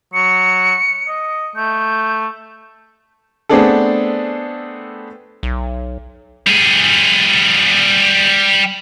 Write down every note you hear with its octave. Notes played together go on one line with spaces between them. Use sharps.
F#3 C#7
D#5
A3 G6
A3 B3 C4 D4 G#4 A4
B1
G3 G#4